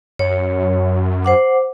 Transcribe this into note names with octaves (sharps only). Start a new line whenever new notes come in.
F#2 C#5
C5 F#5 D6